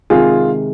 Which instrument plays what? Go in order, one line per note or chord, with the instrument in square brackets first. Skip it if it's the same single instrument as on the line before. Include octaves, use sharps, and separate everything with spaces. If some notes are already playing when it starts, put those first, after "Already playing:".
[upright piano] C3 D#3 G#3 F4 G#4